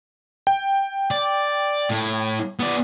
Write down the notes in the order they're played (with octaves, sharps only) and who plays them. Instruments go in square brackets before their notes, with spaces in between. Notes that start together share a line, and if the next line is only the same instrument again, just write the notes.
[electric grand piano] G5
[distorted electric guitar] D5
A2
B3 D5